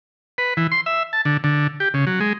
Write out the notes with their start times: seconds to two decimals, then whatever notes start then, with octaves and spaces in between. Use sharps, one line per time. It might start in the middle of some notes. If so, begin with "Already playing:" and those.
0.38 B4
0.57 E3
0.72 C6
0.86 E5
1.13 A5
1.25 D3
1.44 D3
1.80 G4
1.94 C#3
2.07 F#3
2.20 G#3